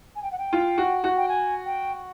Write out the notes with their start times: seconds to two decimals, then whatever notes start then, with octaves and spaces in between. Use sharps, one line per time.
0.16 G#5
0.23 G5
0.32 F#5
0.38 G5
0.53 F4
0.78 F#4
1.04 F#4
1.17 G5
1.28 G#5
1.66 G5